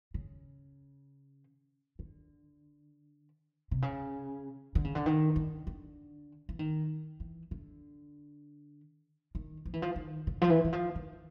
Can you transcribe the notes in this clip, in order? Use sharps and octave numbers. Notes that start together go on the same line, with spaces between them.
C#3
D3
C3
C#3
D3
C#3
D3
D#3
D3
D3
E3
D#3
E3
D3
D#3
F3
E3
F3
D#3
D3
F3
E3
E3
F3
D#3